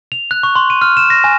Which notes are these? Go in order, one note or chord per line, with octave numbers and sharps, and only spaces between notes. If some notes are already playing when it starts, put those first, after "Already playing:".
F7
F#6
C#6
C6
D#7
F6
E7
A#6
G#5